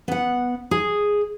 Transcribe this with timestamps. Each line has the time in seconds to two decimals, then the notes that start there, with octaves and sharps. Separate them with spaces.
0.08 B3 F#5
0.71 G#4